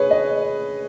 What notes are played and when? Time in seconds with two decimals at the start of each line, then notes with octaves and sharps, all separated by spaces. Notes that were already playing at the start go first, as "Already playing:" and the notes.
Already playing: G#4 B4 C#5
0.11 D#5